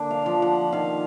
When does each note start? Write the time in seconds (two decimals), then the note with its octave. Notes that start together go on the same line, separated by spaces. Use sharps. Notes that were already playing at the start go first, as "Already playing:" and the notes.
Already playing: D3 A#3 D4
0.11 F5
0.26 F3
0.42 F#5
0.73 D#3 F5